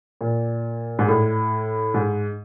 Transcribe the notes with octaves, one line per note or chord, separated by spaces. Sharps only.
A#2
G#2
A2
G#2